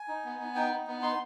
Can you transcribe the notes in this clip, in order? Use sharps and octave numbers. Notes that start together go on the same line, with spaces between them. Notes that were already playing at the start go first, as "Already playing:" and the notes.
Already playing: G#5
D#4
B3
B3
D#4 G5
D#4
B3
D#4 C6